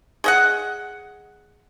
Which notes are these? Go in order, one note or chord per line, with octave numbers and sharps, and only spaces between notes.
G#4 D#5 F#5